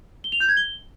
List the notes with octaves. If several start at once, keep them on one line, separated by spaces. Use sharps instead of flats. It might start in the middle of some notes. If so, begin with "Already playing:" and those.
G7
F7
G6
G#6
G7